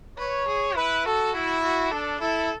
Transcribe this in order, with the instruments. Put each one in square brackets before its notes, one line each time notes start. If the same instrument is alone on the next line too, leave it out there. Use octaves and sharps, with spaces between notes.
[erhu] B4 [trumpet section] C#5
[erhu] G#4
[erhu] E4 [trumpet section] B4
[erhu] F#4 [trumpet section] A4
[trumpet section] E4
[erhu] F#4
[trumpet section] D4 [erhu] A4
[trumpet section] E4 [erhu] A4